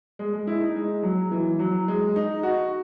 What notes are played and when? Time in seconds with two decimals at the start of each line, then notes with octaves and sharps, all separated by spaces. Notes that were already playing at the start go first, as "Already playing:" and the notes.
0.19 G#3
0.33 G#3
0.47 E4
0.61 D#4
0.75 G#3
1.03 F#3
1.32 E3
1.59 F#3
1.88 G#3
2.16 D#4
2.43 F#4